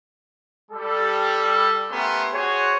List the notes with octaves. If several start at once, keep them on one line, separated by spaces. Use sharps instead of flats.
G3 A4
A3 B3 C#4 G4 A#4 C6
F#4 G#4 C5 C#5